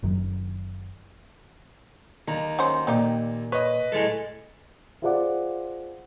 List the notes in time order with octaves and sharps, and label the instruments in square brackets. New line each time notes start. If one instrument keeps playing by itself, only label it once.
[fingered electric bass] F#1 F#2 D#3 F#3
[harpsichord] D#2 [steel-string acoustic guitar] A#5
[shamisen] F#3 C#4 C5
[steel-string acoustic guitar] A#2 [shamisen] C4 D#4 G4
[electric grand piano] B4 D#5 [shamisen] C#5
[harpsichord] A2 G#3 A4
[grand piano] F4 G#4 C5 D5 F#5 D6